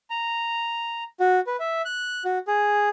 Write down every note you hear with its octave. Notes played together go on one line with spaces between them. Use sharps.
A#5
F#4
B4
E5
F#6
F#4
G#4